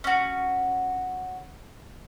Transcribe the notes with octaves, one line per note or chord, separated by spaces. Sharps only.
C#4 F#4